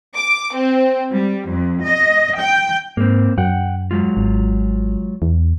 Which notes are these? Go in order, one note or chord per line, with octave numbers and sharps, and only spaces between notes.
D6
C4
G3
F2
D#5
G5
G#2 A#3 C4
F#2 F#5 G5
F#3 G#3 F4
G#1
E2